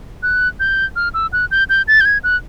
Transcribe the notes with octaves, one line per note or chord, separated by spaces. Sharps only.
F#6
G6
F6
E6
F#6
G6
G6
A6
G6
G#6
F#6